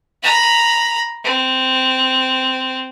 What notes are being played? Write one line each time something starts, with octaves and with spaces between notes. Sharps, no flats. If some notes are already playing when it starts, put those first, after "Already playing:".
A#5 B5
C4